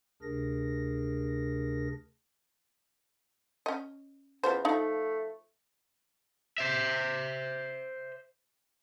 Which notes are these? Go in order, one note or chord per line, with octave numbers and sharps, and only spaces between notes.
D2 C3 D4 G#4 A#4 A#6
C#4 D#5
E2 C#4 F4 C5
F3 A3 D#4 F5
C5 E5